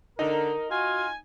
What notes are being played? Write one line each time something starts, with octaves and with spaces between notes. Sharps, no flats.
D3 D#4 A#4
F4 F#4 G#5